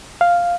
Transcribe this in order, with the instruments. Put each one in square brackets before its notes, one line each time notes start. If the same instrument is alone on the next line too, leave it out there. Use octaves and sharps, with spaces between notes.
[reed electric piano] F5